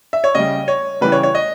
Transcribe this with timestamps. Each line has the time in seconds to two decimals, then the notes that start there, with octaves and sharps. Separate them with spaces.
0.13 E5
0.24 C#5
0.35 C#3 G3 D#5
0.68 C#5
1.01 C#3 E3 G3 B4
1.12 C#5
1.23 C#5
1.35 D#5